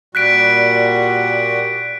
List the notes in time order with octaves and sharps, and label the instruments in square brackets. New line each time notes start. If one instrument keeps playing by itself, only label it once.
[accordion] A#2 G3 F#4 [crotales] F#6 B6 D7